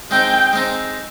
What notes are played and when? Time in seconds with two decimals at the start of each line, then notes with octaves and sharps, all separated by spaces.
0.11 G#3 C4 D#4 G5
0.53 G#3 C4 D#4